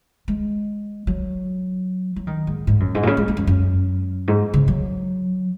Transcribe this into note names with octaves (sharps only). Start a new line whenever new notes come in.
G#3
F#3
F#3
D#3
G#2
G#2
F#2
G#2
A#2
C#3
G#3
G#3
F#2
F#2
G#2
C#3
F#3